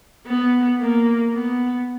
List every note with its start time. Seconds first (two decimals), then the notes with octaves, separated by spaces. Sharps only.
0.27 B3
0.81 A#3
1.35 B3